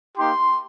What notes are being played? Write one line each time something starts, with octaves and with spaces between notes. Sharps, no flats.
A#3 D#4 G4 C6